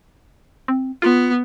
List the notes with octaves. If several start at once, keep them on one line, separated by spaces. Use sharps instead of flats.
C4
B3 F4